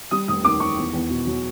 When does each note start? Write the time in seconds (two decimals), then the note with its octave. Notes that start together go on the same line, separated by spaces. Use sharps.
0.11 G3 D#6
0.28 F1 D#6
0.44 D#2 D6
0.60 D#3 C#6
0.77 E2
0.94 E2
1.10 B2
1.27 F#3